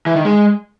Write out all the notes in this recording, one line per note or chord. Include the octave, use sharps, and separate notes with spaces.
E3
D#3
G#3